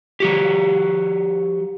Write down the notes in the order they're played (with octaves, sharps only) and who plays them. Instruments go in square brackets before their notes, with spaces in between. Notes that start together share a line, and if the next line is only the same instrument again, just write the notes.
[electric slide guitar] F3 F#4 G4